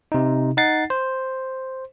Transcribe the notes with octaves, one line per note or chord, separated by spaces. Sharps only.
C3 D#4
D#4 F#5 A6 C7
C5